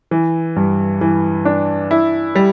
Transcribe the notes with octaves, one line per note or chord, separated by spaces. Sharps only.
E3
G2
E3
D4
E4
G3